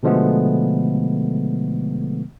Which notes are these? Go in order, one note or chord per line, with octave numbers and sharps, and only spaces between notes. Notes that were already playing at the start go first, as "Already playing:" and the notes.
B2 D3 F3 G#3 A3 B3